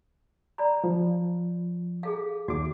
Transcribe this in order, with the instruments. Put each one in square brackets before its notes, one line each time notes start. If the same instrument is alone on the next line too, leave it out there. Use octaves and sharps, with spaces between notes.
[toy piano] D5 A#5 B5
[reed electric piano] F3
[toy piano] G#4 A4 F5
[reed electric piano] D#2 D6 [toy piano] F#4